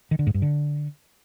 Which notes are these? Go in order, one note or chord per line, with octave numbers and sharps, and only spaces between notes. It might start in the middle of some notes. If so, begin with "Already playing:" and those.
D#3
D3
G#2
G2
D3